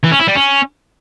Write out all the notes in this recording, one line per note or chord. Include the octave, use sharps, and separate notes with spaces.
E3
C#4
E4
G3
C#4